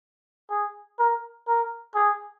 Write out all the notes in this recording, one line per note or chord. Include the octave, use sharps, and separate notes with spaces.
G#4
A#4
A#4
G#4